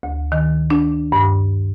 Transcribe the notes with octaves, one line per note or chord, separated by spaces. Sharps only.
D2
D#3
D4
G2